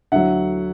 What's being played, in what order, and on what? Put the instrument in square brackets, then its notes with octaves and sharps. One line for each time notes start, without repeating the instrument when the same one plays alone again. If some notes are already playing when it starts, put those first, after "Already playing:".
[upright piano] D2 D3 F#3 E5 F#5